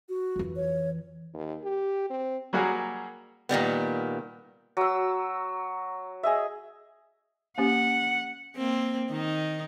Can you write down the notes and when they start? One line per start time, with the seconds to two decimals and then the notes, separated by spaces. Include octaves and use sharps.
0.09 F#4
0.36 F2 E3
0.56 C#5
1.34 D#2
1.64 G4
2.10 C4
2.53 F#3 G3 A#3 F#4 G#4 A#4
3.49 A#2 D#3 G3 B3
4.77 F#3 E6
6.23 G#4 D#5 E5
7.58 A#3 C#4 G4 F#5
8.56 A#3 C4
9.09 D#3 D#4